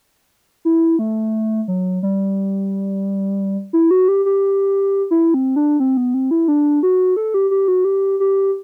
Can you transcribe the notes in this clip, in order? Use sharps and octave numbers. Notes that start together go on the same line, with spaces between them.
E4
A3
F#3
G3
E4
F#4
G4
G4
E4
C4
D4
C4
B3
C4
E4
D4
F#4
A4
G4
G4
F#4
G4
G4